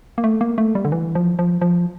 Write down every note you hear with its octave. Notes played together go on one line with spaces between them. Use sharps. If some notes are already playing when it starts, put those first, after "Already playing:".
A#3
A3
A#3
A3
G3
D3
E3
F3
F3
F3